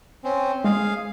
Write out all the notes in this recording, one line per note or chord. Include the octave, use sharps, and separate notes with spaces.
C4 C#4
G#3 G#4 F5